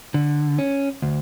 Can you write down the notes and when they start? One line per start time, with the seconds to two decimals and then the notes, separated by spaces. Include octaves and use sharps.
0.14 D3
0.59 C#4
1.02 D2